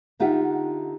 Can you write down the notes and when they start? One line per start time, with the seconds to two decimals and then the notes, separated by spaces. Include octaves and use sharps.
0.20 D3 D#4 F4 G4 E5 F#5